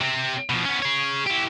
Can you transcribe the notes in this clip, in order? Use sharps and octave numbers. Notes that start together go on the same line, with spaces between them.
C3 C4
B2 F3
B3 C#4
G#4 C#5
E4 G4